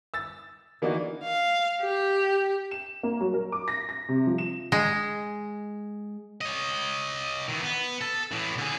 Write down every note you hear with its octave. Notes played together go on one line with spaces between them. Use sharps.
E6 A6
E3 A#3 D4 D#4 F#4
F5
G4
E7
A#3
F#3
A#4
D6
A#6
A#6
C3
F3
E7
G#3
C#5 D#5
D#3 E3
B3
A4
A2 E3
D3 G#4